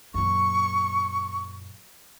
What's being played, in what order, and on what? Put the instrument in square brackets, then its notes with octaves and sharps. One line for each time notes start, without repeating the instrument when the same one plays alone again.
[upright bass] F#2 A#2 [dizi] C#6